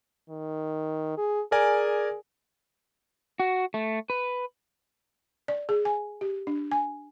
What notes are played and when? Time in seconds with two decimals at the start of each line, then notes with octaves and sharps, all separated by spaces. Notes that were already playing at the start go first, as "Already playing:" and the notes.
0.30 D#3
1.18 G#4
1.52 G#4 A#4 D5 G#5
3.40 F#4
3.74 A3
4.10 B4
5.48 D5
5.69 G#4
5.85 G#5
6.21 G4
6.47 D4
6.72 G#5